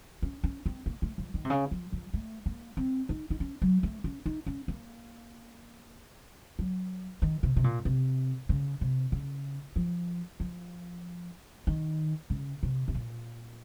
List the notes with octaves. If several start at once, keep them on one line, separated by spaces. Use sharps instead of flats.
C#4
C#4
C4
A#3
A3
F3
D#3
C3
C#3
F3
F3
A3
A#3
C4
D#4
D#4
C#4
F#3
A3
C#4
D#4
C#4
A#3
F#3
D#3
C3
C3
A#2
C3
C#3
C3
C#3
F3
F3
D#3
C#3
C3
C3
A#2